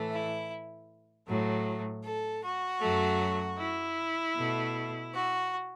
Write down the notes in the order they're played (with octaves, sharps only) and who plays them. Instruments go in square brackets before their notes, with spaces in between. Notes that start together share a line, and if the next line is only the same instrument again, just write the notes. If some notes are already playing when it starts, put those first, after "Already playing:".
Already playing: [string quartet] A2 E3 A3
E4
A2 F#3 A3
A4
F#4
F#2 F#3 A3
E4
B2 A3
F#4